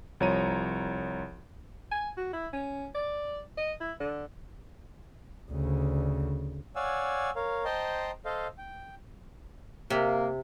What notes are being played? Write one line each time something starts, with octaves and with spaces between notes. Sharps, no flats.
C2 F3 C#5 A#5 D#7
G#5
F#4
E4
C#4
D5
D#5
E4
D3
D2 C#3
C#5 D5 F5 F#5 G#5 E6
A#4 C#5 F5
C5 D#5 G5 A5 A#5 C6
A4 C5 D#5 F5
G5
C3 A#3